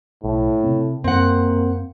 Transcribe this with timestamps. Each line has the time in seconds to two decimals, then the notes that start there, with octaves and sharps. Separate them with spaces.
0.24 B1 A2
0.64 C3 C4
1.04 F#2 A#3 C4 F#5